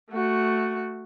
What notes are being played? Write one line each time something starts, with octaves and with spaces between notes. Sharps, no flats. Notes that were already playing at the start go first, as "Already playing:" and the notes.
A3 F#4